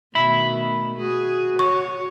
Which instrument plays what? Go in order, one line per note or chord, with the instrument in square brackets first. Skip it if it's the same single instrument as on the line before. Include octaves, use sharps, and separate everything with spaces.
[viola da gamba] B2 D#3 A3 [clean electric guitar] E5 B5
[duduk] F#4 [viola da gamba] G#4
[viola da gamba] C#5 [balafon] C#6